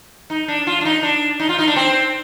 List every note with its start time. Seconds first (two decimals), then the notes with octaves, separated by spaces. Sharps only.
0.30 D#4
0.48 D4
0.67 F4
0.81 D4
0.85 D#4
1.03 D4
1.40 D#4
1.49 F4
1.59 D#4
1.68 D4
1.76 C4